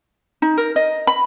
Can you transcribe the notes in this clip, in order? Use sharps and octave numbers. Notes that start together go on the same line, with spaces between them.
D#4
A#4
D#5
B5